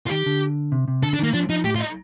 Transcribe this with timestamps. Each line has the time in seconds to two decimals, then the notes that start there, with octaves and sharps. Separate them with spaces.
0.06 F4
0.10 D#3 G4
0.26 D3
0.72 C3
0.88 C3
1.02 D3 A4
1.14 D4
1.19 D#3 A#3
1.34 F3 D4
1.49 F3 D#4
1.65 A2 G4
1.76 F4
1.80 D#4